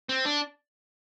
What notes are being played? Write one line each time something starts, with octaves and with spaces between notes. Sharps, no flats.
C4
D4